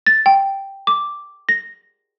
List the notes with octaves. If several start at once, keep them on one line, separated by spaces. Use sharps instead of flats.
A6
G5
D6
A#6